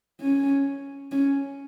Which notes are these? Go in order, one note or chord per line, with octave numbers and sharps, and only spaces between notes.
C#4
C#4